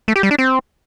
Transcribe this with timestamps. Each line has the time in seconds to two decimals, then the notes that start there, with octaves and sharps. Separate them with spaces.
0.08 A3
0.16 G4
0.23 G3
0.31 D4
0.38 C4